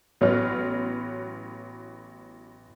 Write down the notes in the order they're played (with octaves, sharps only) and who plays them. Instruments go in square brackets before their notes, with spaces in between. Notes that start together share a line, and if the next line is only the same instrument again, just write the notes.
[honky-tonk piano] A1 F#3 B3 C#5 F6